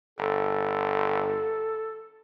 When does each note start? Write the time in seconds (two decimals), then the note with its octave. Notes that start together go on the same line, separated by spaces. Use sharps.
0.19 G1 A4